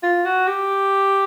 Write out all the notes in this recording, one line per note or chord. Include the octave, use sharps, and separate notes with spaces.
F4
F#4
G4